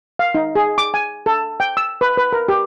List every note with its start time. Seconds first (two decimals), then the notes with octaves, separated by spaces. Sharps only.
0.19 F5
0.35 D#4
0.55 G#4
0.78 D6
0.94 G#5
1.26 A4
1.60 G5
1.77 E6
2.01 B4
2.17 B4
2.33 A#4
2.48 G4